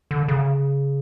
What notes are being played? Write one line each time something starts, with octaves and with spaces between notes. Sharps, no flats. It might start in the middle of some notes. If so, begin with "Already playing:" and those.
D3
C#3